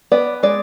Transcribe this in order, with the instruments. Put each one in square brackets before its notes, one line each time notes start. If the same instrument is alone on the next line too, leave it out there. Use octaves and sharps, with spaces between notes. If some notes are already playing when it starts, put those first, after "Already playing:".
[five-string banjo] B3 D5
G#3 D5